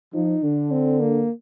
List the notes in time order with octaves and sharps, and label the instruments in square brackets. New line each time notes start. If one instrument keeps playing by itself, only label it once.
[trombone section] F3 [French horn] D#4
[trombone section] D3 [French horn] D4
[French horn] C4
A#3